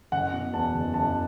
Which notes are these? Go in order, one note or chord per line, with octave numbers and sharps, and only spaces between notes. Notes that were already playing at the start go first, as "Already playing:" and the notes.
F#1 F#5
B2
E2 A5
F#1
F#1 A5